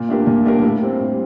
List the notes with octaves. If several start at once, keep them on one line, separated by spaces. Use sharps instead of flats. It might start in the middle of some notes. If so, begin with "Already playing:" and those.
Already playing: A#2
A3 D4 G4 A#4
A#2
A3 D4 G4 A#4
A2
G3 C4
A2